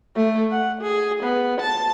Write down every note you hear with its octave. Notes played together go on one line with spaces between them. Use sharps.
A3
F#5
G#4
B3
A5